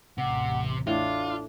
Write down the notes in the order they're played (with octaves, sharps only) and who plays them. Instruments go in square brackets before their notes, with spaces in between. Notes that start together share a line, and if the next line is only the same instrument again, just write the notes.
[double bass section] A1 E2 [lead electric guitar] C3 [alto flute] F#5
[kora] A2 [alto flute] D4 [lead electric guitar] F4